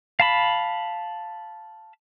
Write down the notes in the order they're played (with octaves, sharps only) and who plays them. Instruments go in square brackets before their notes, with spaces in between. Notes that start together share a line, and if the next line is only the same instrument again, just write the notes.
[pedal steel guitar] F5 A5 B5